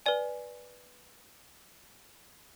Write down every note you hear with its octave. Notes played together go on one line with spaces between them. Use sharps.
B4 D5 G#5